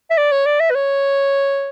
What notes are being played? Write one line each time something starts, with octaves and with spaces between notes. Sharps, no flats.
E5
D5
C#5
D5
E5
B4
C#5